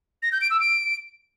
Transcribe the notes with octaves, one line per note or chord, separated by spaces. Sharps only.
A#6
G6
D7
E6
D7